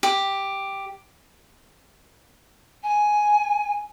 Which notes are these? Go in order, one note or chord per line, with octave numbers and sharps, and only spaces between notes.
G4
G#5